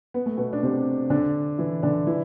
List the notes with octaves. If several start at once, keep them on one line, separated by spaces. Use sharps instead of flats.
B3
A3
B2 B3
D4
C3 C4
D3 D4
E3 E4
D3 D4
E3 E4